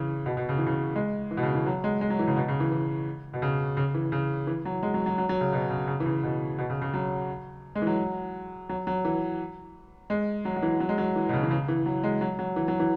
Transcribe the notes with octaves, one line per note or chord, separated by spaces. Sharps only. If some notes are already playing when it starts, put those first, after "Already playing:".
Already playing: C#3 E3
B2
B2
C#3
E3
C#3
G#3
E3
B2
C#3
E3
F#3
G#3
G#3
F#3
E3
C#3
B2
C#3
E3
E3
B2
C#3
C#3
E3
C#3
E3
F#3
G#3
F#3
F#3
F#3
F#3
C#3
B2
C#3
C#3
E3
C#3
B2
B2
C#3
C#3
F#3
G#3
E3
F#3
F#3
F#3
E3
G#3
F#3
F#3
E3
F#3
G#3
F#3
E3
B2
C#3
E3
C#3
E3
F#3
G#3
F#3
F#3
E3
F#3
E3